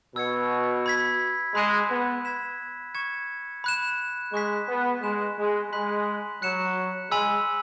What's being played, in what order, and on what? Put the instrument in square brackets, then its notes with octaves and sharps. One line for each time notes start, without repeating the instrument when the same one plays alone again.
[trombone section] B2 [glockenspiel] E6 G#6 C#7
[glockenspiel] B5 G#6 B6
[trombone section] G#3 [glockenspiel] B5 F#6 E7
[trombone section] B3
[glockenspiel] B5 G#6 B6 E7
C#6 G#6 C#7 E7
B5 F#6 E7
[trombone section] G#3 [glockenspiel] C#6 F#6 B6
[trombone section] B3
[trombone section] G#3 [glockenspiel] F#6 E7
[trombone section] G#3
[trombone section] G#3 [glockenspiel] B5 F#6 B6 F#7
[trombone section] F#3 [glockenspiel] F#6 C#7 E7
[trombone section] G#3 [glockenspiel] G#5 B5 E6 B6 F#7